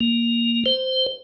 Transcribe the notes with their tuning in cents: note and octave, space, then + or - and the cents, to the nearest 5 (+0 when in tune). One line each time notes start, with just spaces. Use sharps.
A#3 +10
C5 -10